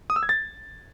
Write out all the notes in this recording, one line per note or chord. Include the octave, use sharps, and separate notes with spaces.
D#6
E6
G#6
A6